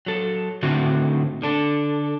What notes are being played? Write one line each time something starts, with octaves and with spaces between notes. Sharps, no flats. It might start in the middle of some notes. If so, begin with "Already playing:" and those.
F#3 A4
A2 D3 D#3 A3 C4 F#4
D3 D4 A4